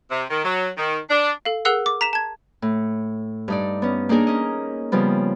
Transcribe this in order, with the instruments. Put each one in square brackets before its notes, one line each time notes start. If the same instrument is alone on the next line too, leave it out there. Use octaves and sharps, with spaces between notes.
[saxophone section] C3
D#3
F#3
D#3
D4
[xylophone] A4 F5
G#4 A#4 F#5 E6 F#6 C7
D6
A#5 B6 E7
A5 G#6
[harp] A2
G2 D#4 D5
B3 C#4
A#3 D4 D#4 G#4 A#4
C#4 D#5
C#3 F3 G3 B3